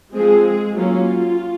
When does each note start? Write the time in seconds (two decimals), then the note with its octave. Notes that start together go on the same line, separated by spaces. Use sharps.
0.13 F3 G#3 C4 G#4
0.75 F#3 A#3 C#4 F4